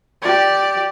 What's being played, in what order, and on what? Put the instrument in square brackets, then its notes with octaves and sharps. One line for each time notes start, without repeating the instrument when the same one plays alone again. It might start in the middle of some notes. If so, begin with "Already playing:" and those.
[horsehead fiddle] G4 D5